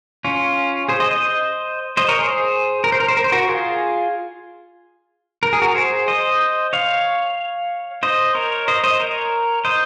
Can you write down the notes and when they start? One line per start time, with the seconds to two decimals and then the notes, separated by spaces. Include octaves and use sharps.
0.24 C#4 F4
0.89 G#4 C5
1.00 C5 D#5
1.11 C5 D#5
1.97 C5 D#5
2.08 A#4 C#5
2.19 G#4 C5
2.84 A#4
2.92 C5
3.00 A#4
3.08 C5
3.17 A#4
3.24 C5
3.32 F#4 A#4
3.49 F4 G#4
5.43 A#4
5.53 G#4
5.62 F#4 A#4
5.75 G#4 C5
6.08 C5 D#5
6.73 C#5 F5
8.03 C5 D#5
8.35 A#4 C#5
8.68 C5 D#5
8.83 C5 D#5
9.00 A#4 C#5
9.65 C5 D#5